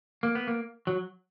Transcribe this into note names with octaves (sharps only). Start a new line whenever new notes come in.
A#3
B3
A#3
F#3